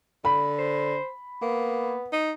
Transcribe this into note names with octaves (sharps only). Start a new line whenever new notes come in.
D3 B5
C5
A#3 B3
D#4